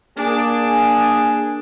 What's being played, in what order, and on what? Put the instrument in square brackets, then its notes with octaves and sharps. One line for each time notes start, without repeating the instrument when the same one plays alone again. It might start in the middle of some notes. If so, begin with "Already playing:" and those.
[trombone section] A#3 G#4 [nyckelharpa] D4